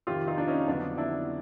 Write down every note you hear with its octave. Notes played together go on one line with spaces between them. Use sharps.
F2 C3 D#3 F4 G4
D#4 F4
D4
C#4 D#4
F2 D3 F#3 B3 D4
D4 E4